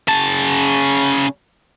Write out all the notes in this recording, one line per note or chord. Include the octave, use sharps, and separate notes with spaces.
C#3 A5